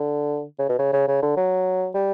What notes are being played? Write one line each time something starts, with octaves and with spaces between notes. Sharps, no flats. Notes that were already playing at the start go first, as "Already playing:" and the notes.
Already playing: D3
C#3
B2
C#3
C#3
C#3
D3
F#3
G3